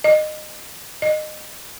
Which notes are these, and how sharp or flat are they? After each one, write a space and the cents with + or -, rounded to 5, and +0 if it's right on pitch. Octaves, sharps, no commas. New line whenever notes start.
D#5 -25
D#5 -25